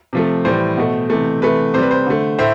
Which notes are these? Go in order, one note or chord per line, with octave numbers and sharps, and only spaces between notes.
C3 F3 A3
A2 E3 G3 C5
B2 A3
C3 E3 A3
C3 E3 A3 B4
C3 G3 B4 C5
C5
D3 A3
A2 C5 E5